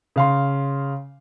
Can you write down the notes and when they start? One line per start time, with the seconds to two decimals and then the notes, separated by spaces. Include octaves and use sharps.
0.16 C#3 F5 C6